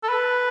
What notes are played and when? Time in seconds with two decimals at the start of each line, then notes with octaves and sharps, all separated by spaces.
0.03 A4
0.09 B4